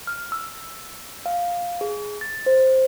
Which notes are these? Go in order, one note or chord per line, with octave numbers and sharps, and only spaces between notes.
F6
E6
F5
G#4
A6
C5